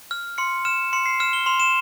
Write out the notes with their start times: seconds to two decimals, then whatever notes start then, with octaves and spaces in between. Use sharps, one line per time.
0.11 F6
0.38 C6 C#7
0.65 F6 E7
0.93 C6 C#7
1.06 C7
1.20 F6 E7
1.33 G7
1.46 C6 F7
1.60 E7